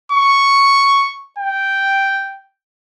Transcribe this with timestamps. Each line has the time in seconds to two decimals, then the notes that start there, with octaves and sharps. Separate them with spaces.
0.12 C#6
1.38 G5